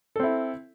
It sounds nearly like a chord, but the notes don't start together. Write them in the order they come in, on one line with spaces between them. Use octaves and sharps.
A4 C4 E4